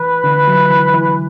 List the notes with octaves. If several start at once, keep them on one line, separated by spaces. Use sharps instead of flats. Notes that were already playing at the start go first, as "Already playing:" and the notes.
Already playing: E3 B4
D3
F#3
E3
E3